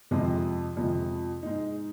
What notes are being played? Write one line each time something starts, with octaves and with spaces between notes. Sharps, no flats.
F2 C3 F3 G#3
F2 C3 F3 G#3
G#2 G#3 D#4